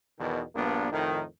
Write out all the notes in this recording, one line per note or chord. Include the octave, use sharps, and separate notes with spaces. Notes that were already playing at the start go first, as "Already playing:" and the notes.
E2 B2 D#3
A#1 G2 A#3 B3 D4
F2 A2 D#3